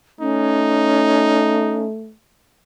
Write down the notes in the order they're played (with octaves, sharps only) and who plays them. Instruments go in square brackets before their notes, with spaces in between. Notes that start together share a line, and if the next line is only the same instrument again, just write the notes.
[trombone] A3 [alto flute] C#4 [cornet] D#4